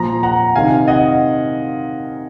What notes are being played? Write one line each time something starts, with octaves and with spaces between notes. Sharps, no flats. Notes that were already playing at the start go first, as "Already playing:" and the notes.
Already playing: A#2 F3 A#5
F#5 A#5
C3 D#3 F5 G#5
D#5 F#5